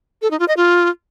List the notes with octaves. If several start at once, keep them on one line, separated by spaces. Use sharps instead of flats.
A4
D#4
F4
D#5
F4